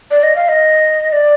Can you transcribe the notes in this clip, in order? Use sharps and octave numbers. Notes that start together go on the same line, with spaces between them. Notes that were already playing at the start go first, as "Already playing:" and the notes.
D5
D#5
F5
D#5
D5